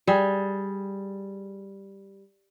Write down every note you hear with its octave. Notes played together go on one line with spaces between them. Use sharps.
G3 G#4